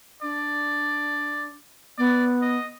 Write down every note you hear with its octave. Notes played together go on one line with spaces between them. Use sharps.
D4 D5
B3 D5
D#5